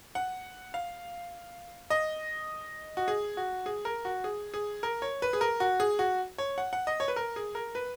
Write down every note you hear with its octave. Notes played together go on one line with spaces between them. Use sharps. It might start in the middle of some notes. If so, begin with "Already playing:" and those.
F#5
F5
D#5
F#4
G#4
F#4
G#4
A#4
F#4
G#4
G#4
A#4
C#5
B4
G#4
A#4
F#4
G#4
F#4
C#5
F#5
F#5
D#5
C#5
B4
A#4
G#4
A#4
B4